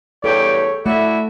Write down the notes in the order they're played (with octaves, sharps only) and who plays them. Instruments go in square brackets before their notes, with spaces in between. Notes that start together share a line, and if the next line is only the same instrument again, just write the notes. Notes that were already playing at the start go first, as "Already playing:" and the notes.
[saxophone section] E2 G2 G4 [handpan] A4 [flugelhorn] C#5
[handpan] A3 [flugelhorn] E4 [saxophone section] F#4 D5 E5